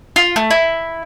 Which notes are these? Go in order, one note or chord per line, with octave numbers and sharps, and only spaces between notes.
F4
A3
E4